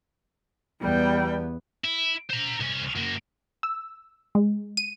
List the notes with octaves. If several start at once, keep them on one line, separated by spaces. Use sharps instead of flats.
E2 G3 B3 G5
E4
C5 A#5
C2 C#4
F#2 A#3
E6
G#3
D#7